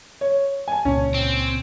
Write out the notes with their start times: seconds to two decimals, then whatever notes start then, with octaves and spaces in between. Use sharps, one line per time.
0.21 C#5
0.68 G#5 A5
0.85 C#2 A#2 C#4
1.14 C4